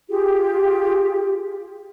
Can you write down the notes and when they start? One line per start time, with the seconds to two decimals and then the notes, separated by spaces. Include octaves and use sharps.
0.09 F4 G4 G#4